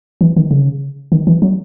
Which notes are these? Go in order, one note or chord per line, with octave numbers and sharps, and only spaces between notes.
E3
D#3
C#3
D#3
E3
F#3